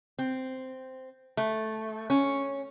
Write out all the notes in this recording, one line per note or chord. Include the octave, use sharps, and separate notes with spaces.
C4
A3
C#4